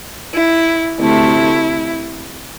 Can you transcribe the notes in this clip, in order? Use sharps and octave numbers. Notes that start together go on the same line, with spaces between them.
E4
D2 C3 A3 E4